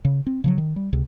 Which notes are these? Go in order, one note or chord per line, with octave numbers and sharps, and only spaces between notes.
C#3
C4
C#3 F3 F#3
D#3
G3
C#2 C3